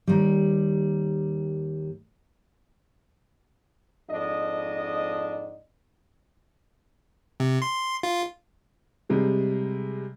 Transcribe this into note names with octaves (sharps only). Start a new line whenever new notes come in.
D#2 G3
F2 G#2 D4 D#5
C3
C6
F4
C3 G3 G#3 G#4